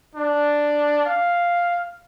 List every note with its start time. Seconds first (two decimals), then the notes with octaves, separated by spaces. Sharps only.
0.15 D4
1.06 F5